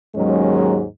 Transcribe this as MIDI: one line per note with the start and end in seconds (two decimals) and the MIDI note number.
0.15 0.85 39
0.15 0.85 44
0.15 0.85 51
0.15 0.85 54
0.15 0.85 56
0.15 0.85 61